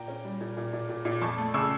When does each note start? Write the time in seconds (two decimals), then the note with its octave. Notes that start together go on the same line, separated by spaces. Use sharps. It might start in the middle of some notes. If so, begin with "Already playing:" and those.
Already playing: A#2 G5 A#5
0.08 C#4
0.25 G3
0.41 A#2
0.57 A#2
0.73 A#2
0.89 A#2
1.05 A#2
1.21 F2 A5 C#6
1.38 A3
1.54 C#3 C#6 E6